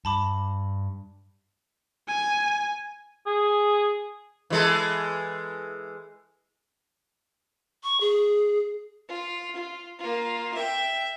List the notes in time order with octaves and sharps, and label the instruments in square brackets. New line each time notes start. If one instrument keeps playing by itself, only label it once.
[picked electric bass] G2 [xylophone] A5 B5 D6
[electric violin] G#5
[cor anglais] G#4
[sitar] E3 G#3 A4
[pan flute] C#6
G#4
[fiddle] F4
F4
A#3 F4
E5 G5